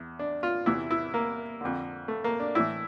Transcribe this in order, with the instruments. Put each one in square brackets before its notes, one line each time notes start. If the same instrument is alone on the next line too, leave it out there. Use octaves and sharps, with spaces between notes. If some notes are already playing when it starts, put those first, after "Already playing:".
Already playing: [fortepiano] E2
D4
F4
E2 C3 E3 E4
E4
A#3
F2 D3
A3
A#3
D4
A2 E3 E4